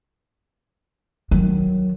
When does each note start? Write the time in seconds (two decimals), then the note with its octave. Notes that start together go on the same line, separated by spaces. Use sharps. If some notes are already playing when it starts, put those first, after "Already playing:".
1.31 D#3 F#3